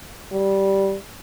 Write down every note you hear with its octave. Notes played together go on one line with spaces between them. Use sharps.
G3